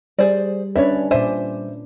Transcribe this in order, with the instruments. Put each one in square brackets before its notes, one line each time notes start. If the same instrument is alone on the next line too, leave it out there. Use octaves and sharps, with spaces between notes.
[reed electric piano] G3 [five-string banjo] G#4 C5 D5
[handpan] C#4 D4 B4 [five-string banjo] C#5 D5 E5
[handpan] A#2 D5 [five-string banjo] C5 E5 G#5